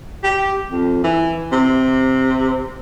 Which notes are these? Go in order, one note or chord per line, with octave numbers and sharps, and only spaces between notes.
G4
F2
E3
C3